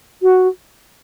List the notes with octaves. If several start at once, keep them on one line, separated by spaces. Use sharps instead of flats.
F#4